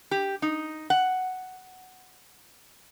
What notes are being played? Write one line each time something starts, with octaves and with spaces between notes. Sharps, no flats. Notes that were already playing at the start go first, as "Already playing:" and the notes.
G4
D#4
F#5